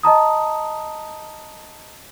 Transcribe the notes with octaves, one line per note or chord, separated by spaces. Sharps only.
D#5 A5 A#5 D#6